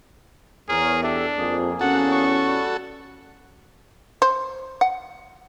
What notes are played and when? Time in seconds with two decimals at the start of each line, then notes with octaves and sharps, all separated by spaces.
0.69 E2 G#4 A#4 C#5
1.03 D4 G4 A4 E5
1.38 F2 A#3 G#4
1.81 E2 C#4 F#4 A4 F#5
2.12 C#6
2.46 G3
4.22 C5
4.81 F#5